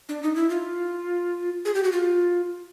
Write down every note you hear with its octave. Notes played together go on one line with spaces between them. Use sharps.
D4
D#4
E4
F4
G#4
G4
F#4
F4